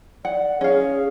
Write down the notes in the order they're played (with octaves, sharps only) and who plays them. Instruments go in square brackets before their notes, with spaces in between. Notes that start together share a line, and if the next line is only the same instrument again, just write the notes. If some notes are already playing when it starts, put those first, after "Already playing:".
[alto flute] D5 [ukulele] F#5
[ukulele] C#4 F5 [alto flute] G#4